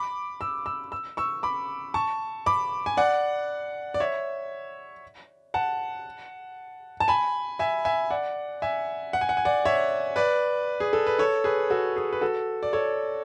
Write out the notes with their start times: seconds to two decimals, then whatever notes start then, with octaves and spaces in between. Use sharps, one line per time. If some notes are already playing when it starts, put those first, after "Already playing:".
Already playing: B5 D6
0.41 E6
0.66 E6
0.92 E6
1.17 C#6 E6
1.43 B5 D6
1.94 A5 C#6
2.46 B5 D6
2.86 G#5
2.97 D5 F#5
3.94 D5
4.00 C#5 E5
5.54 F#5 A5
7.00 A5
7.08 G#5 B5
7.59 E5 G#5
7.85 E5 G#5
8.11 D5 F#5
8.62 E5 G#5
9.13 F#5
9.21 G#5
9.29 F#5
9.37 G#5
9.45 D5 F#5
9.65 C#5 E5
10.16 B4 D5
10.80 G#4
10.93 A4
11.07 B4
11.19 A4 C#5
11.44 G#4 B4
11.70 F#4 A4
11.96 G#4
12.13 B4
12.21 F#4 A4
12.63 D5
12.73 A4 C#5